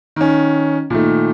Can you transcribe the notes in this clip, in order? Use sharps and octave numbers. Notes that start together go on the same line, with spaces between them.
D#3 C#4
A#2 D#3 A3